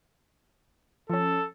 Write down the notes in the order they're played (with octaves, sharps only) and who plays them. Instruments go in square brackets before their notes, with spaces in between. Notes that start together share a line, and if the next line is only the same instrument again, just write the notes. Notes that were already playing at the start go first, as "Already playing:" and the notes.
[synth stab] F3 C#4 [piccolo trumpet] A4